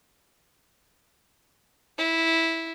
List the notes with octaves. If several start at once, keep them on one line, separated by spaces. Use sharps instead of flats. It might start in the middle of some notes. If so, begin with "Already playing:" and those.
E4